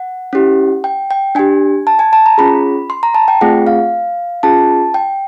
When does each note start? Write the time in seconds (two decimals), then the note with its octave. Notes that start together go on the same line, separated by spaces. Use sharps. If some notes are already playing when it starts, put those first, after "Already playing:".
Already playing: F#5
0.33 C#4 E4 G4
0.84 G5
1.11 G5
1.35 D4 G4 G#5
1.87 A5
1.99 G#5
2.13 A5
2.26 A#5
2.38 C#4 F4 G#4 B5
2.90 C6
3.03 A#5
3.15 A5
3.28 G5
3.41 A3 C4 F4 G#4 F#5
3.67 F5
4.43 C#4 F4 G#4 A5
4.94 G5